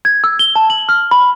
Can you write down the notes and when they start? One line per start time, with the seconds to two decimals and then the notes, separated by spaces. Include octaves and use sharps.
0.05 G#6
0.24 E6
0.39 G7
0.55 A5
0.70 F#7
0.89 F6
1.11 B5